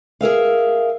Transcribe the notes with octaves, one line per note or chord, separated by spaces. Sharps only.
G#4 A#4 E5 F5